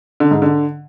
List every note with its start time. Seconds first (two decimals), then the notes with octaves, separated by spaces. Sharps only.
0.20 D3
0.31 G#2
0.42 D3